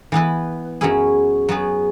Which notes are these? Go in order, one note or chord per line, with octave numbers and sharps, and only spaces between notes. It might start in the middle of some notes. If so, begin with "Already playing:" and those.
E3 B3 E4 B4
F#2 F#3 C#4 E4 G#4
F#3 B3 G#4 B4